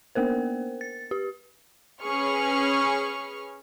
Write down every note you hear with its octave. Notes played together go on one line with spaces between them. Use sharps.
A#3 B3 A#4 C5
A6
G4
C#4 G#4 B4 C#6 F6